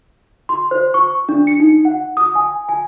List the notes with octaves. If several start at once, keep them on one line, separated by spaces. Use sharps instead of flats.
C6
C5
C#6
D4
C#7
D#4
F#5
D#6
G#5
G#5